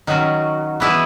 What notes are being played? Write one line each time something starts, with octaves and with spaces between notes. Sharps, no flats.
D#3 F#3 C#4 F#4
E3 B3 E4 G#4 B4